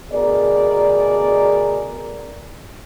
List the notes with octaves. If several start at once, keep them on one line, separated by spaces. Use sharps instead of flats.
D2 B2 G#4 A#4 D5